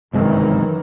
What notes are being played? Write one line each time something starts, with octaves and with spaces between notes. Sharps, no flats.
G1 F#2 C3 D#3 E3 G#3